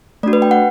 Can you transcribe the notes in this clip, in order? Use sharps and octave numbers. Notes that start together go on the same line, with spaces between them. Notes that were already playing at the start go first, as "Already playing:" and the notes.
A3 D4 F#4 D5
B4
G5
F#5